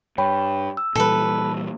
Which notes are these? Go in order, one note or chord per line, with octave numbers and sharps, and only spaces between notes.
G2 C#5 G5 B5
E6
A#2 E3 G3 A4 B4